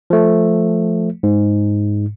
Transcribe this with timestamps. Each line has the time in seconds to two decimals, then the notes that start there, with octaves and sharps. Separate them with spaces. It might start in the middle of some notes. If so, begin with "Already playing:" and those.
0.10 F3 A3
1.23 G#2